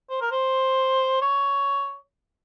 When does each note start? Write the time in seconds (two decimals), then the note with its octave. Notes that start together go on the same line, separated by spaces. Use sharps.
0.10 C5
0.21 A#4
0.31 C5
1.22 C#5